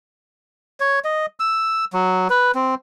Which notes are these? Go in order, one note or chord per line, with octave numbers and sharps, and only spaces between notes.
C#5
D#5
E6
F#3
B4
C4